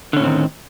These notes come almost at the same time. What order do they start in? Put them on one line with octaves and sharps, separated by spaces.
D3 C#4 A2 C4 D#3